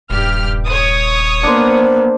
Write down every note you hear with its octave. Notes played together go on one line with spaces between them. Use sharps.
D#1 G2 G4 F6
C#5 D#6
A#3 B3 D4 C5